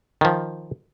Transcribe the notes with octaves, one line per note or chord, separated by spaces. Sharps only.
D#3 F3